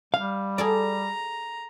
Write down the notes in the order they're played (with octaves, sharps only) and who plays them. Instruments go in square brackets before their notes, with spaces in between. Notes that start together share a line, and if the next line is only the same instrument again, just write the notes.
[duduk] G3 [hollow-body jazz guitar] F5
[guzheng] G#4 A4 D5 [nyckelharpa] A#5